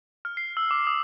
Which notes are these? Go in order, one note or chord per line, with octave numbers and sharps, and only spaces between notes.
F6
C7
E6
D6
D#6